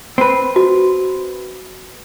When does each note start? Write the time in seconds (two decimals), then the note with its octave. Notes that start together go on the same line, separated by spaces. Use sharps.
0.18 C4 B4
0.56 F#4